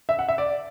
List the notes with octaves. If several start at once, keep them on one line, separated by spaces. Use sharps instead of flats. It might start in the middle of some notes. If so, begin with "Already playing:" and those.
E5
F#5
E5
D5